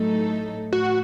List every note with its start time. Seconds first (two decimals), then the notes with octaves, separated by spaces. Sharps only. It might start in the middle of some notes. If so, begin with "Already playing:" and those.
Already playing: A2 F#3 A3 D#4 A4
0.72 A2 E3 F#4